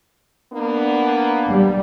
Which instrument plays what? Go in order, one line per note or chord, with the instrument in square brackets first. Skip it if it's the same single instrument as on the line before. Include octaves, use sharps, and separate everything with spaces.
[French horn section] A#3 B3 D4
[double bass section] G3